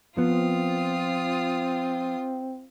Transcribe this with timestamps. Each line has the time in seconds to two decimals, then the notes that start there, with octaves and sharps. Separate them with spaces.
0.17 F3 B3 C4 F4 D#6